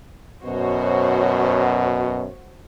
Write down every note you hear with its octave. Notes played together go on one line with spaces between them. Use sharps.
F#2 B2 F#4 C5 C#5